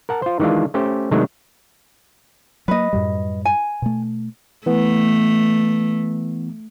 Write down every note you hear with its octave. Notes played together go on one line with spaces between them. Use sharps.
A#4 F#5 A5
F4 C5
D#3 E3 G#3 D4 F4
A3 C#4 G4 C5
C3 D#3 F#3 G#3 A3 D4
F#3 A#3 B4 D#5
F#2 A2 G3
G#5
B2 A3
E3 A3 B3